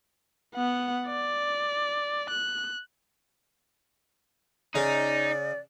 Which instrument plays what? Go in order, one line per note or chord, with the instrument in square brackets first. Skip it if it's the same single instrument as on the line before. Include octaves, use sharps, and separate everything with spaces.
[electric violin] B3 F#5
D5
F#6
[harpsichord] C#3 [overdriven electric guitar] D#4 [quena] D5